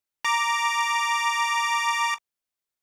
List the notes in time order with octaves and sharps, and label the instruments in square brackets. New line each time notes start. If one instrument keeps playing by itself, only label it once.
[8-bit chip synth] A#5 D6